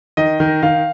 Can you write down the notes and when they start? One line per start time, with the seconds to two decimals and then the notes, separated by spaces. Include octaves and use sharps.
0.17 D#3 D#5
0.40 D#3
0.63 D#3 F5